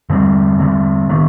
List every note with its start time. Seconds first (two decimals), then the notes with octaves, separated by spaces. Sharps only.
0.10 D3 G3 C4
0.59 D3 G3 C4
1.09 D#3 B3 D4